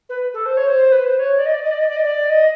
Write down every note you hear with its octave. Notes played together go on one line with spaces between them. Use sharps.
B4
A4
C5
C#5
C5
B4
C5
C#5
D5
D#5
D5
D#5
D5
D#5
D5
D#5
D5
D#5